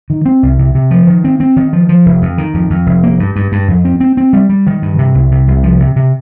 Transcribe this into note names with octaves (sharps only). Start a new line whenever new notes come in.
D#3
C4
C2
C3
C3
F3
D#3
C4
C4
D#3
F3
F3
F1
F2
D#3
F2
F2
F1
A#3
G2
G2
G2
F2
C4
C4
C4
G3
G3
D#3
G2
C3
C2
C3
C2
F3
C3
C3